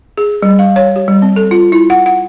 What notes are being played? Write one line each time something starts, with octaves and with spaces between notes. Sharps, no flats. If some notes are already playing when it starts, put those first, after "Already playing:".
G#4
G3
F5
C#5
G4
G3
C4
A4
F4
E4
F#5
F#5